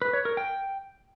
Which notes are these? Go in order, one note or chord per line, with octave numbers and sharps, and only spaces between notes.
B4
C#5
A#4
G5